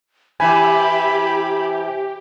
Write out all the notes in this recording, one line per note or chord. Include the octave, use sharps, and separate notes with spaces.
C3 E3 G4 G#5 B5